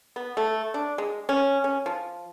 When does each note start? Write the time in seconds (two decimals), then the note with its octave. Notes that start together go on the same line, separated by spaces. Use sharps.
0.16 B3
0.37 A3
0.74 D4
0.98 G#3
1.29 C#4
1.64 C#4
1.86 F3